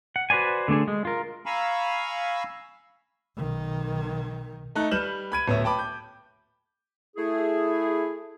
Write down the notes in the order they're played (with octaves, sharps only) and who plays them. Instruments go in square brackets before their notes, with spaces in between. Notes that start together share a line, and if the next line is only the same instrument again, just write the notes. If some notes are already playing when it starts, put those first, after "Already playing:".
[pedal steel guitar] F#5
F#4 B4 C5 D5 G#5
D3 A3 D4 G#4
G#3
F4 A#4
[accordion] F5 G#5 A#5 B5 C#6 E6
[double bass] B1 D#3
[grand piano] A3 D#4 F#6
G3 B4 F6 G6 E7 F#7
B5 G#6 D#7
D1 B3 C#5 E5
G5 A5 B5 D6
G6
[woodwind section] A3 E4 G#4